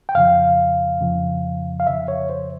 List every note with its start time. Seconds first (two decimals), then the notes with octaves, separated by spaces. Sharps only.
0.09 G5
0.15 F2 C#3 F3 F5
1.01 F2 C#3 F3
1.80 F5
1.86 F2 C#3 F3 E5
2.08 C#5
2.30 C5